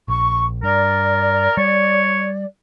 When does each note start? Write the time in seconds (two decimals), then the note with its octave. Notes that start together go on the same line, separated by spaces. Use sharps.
0.08 A#1 C#6
0.63 G2 A#4 D5
1.57 G3 C#5